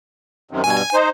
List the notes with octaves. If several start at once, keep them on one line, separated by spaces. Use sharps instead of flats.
F#2 C3 D#3
G2 B2 G#5
D#4 C5